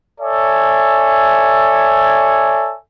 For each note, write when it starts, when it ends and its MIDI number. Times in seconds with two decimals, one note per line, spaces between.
0.20 2.75 69
0.20 2.75 73
0.20 2.75 74
0.20 2.75 76
0.20 2.75 80